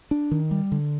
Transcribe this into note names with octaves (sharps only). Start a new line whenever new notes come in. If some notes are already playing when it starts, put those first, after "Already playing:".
D4
D#3
G3
D3